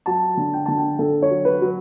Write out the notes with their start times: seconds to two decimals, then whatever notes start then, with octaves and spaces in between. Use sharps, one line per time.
0.06 F#3 A5
0.37 D3
0.53 G5
0.66 D3 A5
0.78 G5
0.99 D3 A4
1.22 C#5
1.30 F#3
1.45 B4
1.62 F#3